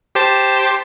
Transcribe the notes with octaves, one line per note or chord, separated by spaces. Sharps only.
G4 C5 A5